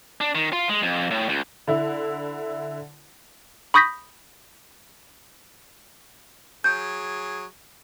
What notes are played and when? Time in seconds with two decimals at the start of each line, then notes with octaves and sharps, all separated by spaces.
0.21 D4
0.35 D#3
0.53 F4
0.69 G#3
0.83 F2
1.11 A2
1.29 C#2
1.68 D3 E4
3.74 B5 C#6 D#6 G6 A#6 B6
6.64 F#3 G#4 G6